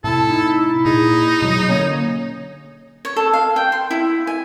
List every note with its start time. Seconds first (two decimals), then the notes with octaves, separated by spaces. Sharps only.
0.04 A2 C3 E4 A4 A5
0.28 D#4
0.85 A#2 D#4 G#4
1.42 B2 F#3
1.69 D3 A#3 C#4 C#5
3.05 C#5
3.16 A4
3.33 F5
3.56 G5
3.72 C6
3.91 E4
4.27 G#5